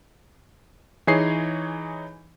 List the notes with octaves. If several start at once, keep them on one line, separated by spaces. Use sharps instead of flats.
E3 D#4 G#4 C#5 C7